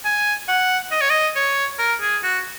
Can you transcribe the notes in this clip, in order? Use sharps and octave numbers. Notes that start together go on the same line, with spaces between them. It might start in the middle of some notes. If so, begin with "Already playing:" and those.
G#5
F#5
D#5
C#5
D#5
C#5
A#4
G#4
F#4